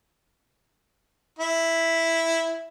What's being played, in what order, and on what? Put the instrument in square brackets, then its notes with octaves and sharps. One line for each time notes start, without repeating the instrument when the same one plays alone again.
[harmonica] E4